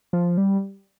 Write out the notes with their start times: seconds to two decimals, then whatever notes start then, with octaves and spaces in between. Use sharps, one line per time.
0.13 F3
0.37 G3